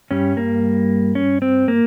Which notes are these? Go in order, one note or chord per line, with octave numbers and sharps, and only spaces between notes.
G2 G3 C#4
A#3
C#4
C4
A#3